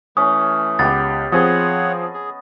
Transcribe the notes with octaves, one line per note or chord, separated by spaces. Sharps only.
E3 A3 C#4 D#6
C#2 B3 G4 A6
F3 C4 G#4 C#5 D#5 F#5 G#5
G#4